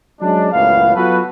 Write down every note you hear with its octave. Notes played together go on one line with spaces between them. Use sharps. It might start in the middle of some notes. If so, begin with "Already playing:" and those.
F#3 G#3 C#4 D4
C#2 F#2 A2 B3 F5
F#3 B3 F4 F#4 A4 B4